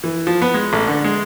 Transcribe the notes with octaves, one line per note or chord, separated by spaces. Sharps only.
E3
F3
B3
G#3
A1
D3
G#3